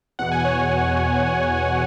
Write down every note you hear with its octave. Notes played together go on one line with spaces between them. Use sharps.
E2 B2 F#5
G#5
C#5 F#5